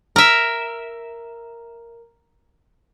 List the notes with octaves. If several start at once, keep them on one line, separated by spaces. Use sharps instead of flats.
A#4 E5